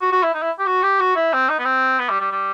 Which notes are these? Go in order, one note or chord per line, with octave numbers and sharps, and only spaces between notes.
F#4
F#4
E4
D#4
E4
G4
F#4
G4
F#4
E4
C4
D#4
B3
C4
B3
G3
G3
G3